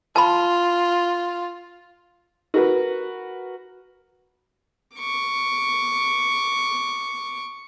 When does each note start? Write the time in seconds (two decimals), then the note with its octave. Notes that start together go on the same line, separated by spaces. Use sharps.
0.16 F4 A5 B5
2.54 F#4 A#4 B4
4.96 C#6 D6